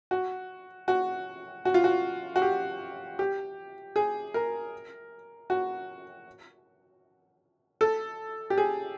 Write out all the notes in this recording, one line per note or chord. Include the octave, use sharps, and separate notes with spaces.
F#4
F#4
F#4
F4
F#4
F#4
G4
G4
G#4
A#4
F#4
A4
G4
G#4